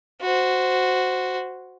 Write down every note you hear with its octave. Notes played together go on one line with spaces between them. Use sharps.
F#4 C5